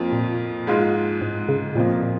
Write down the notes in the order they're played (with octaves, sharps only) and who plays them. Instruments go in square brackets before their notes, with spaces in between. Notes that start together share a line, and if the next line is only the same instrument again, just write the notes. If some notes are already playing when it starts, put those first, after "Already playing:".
Already playing: [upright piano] F2 F3 A#3 F4
[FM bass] A#2
[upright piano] G#2 G#3 F4
[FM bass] G#2
C#3
[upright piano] F2 F3 A#3 [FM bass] A#2
[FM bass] A#2